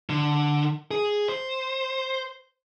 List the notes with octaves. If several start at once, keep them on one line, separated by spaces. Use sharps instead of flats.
D3
G#4
C5